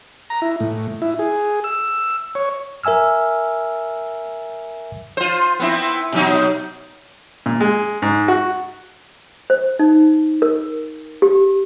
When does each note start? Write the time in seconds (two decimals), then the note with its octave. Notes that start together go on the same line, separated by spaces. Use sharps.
0.30 A#5
0.42 E4
0.60 A2
1.02 E4
1.19 G#4
1.64 E6
2.35 C#5
2.84 A#4 E5 G#5 E6 F6
5.17 F4 C5
5.60 B3 C4 E4
6.12 B2 F#3 D#4
7.46 A#2
7.61 G#3
8.02 G#2
8.28 F#4
9.50 C5
9.79 D#4
10.42 A#4
11.22 G4